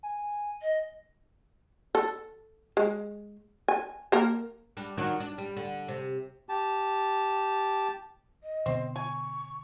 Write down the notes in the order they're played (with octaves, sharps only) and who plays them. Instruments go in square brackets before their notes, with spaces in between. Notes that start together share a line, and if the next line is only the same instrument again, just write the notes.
[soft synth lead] G#5
[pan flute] D#5
[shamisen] A4
G#3
G#5
A#3 A#4
[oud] G3 D4
D#3 F#3 D4
D4
G3
D3
C3
[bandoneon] G4 A5
[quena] D#5
[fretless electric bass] B2 D3 B3 [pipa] C4 C5
[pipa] G#5 [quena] C#6